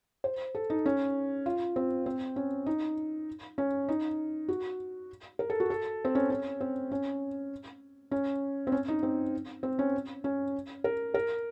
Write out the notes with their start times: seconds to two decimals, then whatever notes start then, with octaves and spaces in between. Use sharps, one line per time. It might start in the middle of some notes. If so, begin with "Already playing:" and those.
0.24 C5
0.55 A4
0.70 D#4
0.86 C#4
1.46 F4
1.76 C4
2.06 C4
2.36 C#4
2.66 D#4
3.58 C#4
3.89 D#4
4.49 F#4
5.39 A#4
5.50 A4
5.60 F#4
5.70 A4
6.05 C4
6.15 C#4
6.30 C#4
6.61 C4
6.91 C#4
8.11 C#4
8.67 C4
8.72 C#4
8.88 D#4
9.03 C4
9.63 C4
9.79 C#4
10.24 C#4
10.84 A#4
11.14 A#4